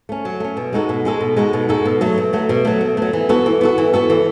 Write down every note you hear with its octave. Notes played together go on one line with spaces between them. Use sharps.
A3 C#4
F#3
A3 C#4
B2
G#3 D#4 F#4 A4
B2
G#3 D#4 F#4 A4
B2
G#3 D#4 F#4 A4
B2
G#3 D#4 F#4 A4
B2
F#3 A3
B2
F#3 A3
B2
F#3 A3
B2
F#3 A3
E3
B3 F#4 A4
E3
B3 F#4 A4
E3
B3 F#4 A4
E3